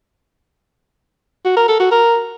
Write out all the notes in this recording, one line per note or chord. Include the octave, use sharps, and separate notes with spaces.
F#4
A#4
A4
F#4
A#4